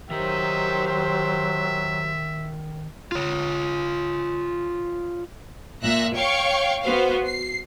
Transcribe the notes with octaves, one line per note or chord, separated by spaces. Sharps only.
D#3 F#3 G4 A#4 C5 E5 A#5
E5
F4 C#5
A#2 E5 F#6 A#6
C#5 F5 G5 C#6
B3 F#4 C5 F5
C7